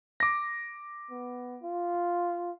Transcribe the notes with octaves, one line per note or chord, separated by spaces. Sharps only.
D6 A#6
B3
F4